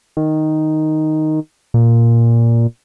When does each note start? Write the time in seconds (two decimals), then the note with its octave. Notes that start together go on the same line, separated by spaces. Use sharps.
0.17 D#3
1.74 A#2